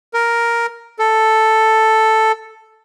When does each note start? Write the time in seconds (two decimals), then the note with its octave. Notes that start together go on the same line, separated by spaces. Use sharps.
0.14 A#4
0.99 A4